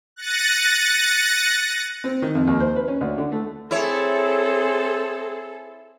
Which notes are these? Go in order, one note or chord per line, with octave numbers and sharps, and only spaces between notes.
F#6 A6 A#6 C#7 D#7
C4
D#3
F2
D#2
C5
B4
C#4
D2
D3
A3
C4 E4 G#4 A4 C#5